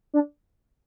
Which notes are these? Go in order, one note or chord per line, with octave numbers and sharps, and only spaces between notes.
D4